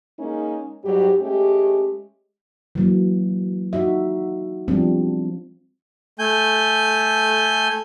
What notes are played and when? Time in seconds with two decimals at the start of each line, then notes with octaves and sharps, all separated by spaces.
0.19 G#3 A#3 C#4 D#4
0.85 G#2 F#3 G3 G4
1.20 G#3 A3 C#4 G4
2.75 E3 F#3 A#3
3.73 D#4 F#4 E5
4.68 F3 G3 B3 C4 D4
6.19 A3 G#5 G6